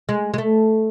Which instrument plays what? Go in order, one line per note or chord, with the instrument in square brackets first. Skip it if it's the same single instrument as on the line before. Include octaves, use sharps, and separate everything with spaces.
[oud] G#3
G#3
A3